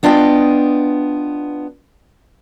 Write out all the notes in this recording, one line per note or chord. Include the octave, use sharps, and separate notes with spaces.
B3 D4 F4 D#5 G5